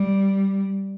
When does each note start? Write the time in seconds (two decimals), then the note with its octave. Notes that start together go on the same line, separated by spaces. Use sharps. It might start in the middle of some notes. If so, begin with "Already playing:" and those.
Already playing: G3